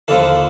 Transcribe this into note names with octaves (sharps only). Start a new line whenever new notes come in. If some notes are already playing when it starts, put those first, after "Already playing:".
D#2 D3 F3 A4